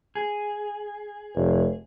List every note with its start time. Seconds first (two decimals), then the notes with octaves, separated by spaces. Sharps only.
0.15 G#4
1.35 F1